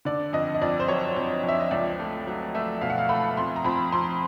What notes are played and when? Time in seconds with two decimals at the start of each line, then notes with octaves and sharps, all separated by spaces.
0.05 D3 D5
0.33 F2 D#5
0.55 D#5
0.62 F2 D5
0.80 C5
0.88 F#3 C#5
1.16 F2
1.43 F2
1.48 E5
1.60 D#5
1.71 C#2 D5
1.99 A3
2.27 F#3
2.54 A3 E5
2.81 B2 F5
2.90 F#5
2.98 F5
3.09 A3 B5
3.37 F2 C6
3.56 A#5
3.64 F2 B5
3.92 F2 C6